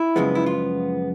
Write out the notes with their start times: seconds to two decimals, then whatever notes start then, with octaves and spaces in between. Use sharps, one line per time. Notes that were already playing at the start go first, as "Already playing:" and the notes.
Already playing: E4
0.16 F#2 C#3 F3 G#3 B3
0.35 E4
0.46 F4